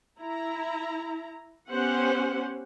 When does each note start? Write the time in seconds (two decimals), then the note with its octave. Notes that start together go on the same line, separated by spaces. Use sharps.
0.21 E4 A#5
1.70 B3 C#4 G4 C5 F#5